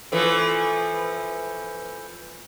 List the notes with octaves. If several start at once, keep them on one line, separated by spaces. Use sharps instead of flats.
E3 F3 A3